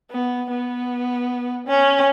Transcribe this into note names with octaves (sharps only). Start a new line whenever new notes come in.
B3
B3
C#4